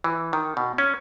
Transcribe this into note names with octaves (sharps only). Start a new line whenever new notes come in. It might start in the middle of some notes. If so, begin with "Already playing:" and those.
E3
D#3
B2
C#4